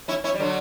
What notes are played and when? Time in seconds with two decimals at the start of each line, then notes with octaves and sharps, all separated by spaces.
0.08 C#4 E4
0.24 C#4 E4
0.34 G3
0.40 D3 F#3